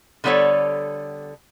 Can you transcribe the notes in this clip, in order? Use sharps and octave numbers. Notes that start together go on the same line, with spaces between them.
D3 G3 B3 A4 C#5 D5